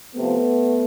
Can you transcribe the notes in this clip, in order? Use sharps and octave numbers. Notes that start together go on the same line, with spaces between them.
C3 F3 A3 B3